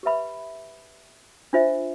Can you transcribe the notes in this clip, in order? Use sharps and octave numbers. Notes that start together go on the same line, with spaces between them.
G4 B4 E5 B5
D4 F4 C5 E5